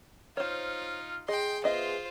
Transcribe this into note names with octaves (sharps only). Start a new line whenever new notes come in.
D#4 F4 C5 C#5 F6
G#4 D#5 G5 C6
B3 F4 C5 D#5 E5